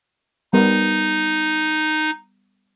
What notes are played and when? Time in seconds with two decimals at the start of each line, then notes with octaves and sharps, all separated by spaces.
0.53 G3 B3 D#4 A#4